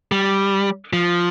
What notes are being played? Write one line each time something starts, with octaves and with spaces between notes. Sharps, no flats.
G3
F3